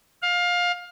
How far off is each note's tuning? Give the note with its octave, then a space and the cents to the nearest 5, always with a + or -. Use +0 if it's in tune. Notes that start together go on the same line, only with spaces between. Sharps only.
F5 +20